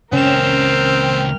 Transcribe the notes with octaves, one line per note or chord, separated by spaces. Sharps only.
C#2 A#3 C4 C#4 A#4 G5 F6 E7